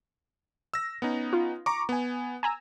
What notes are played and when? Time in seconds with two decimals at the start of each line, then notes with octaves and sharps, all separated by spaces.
0.74 E6 A#6
1.02 B3 C#4 D#4
1.33 F4
1.66 A#5 C#6 D6
1.89 B3 G#5
2.43 G#5 A#5 E6